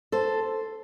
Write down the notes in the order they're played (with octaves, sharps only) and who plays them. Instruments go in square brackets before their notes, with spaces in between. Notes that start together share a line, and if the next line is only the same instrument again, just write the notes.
[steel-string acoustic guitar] A4 C5